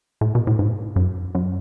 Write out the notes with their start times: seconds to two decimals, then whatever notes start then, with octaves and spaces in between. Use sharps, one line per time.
0.21 A2
0.35 B2
0.47 A2
0.59 G#2
0.96 F#2
1.35 F#2